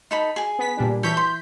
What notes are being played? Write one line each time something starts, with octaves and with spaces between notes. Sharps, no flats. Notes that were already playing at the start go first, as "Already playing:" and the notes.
D#4 A4 B5
G#4 G#5
B3 B6
A#2 G3 D4
E3 A4 C#5 G6 B6
C6